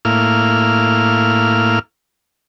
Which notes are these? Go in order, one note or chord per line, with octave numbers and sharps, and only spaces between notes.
A2 A#3 E4 F5 F6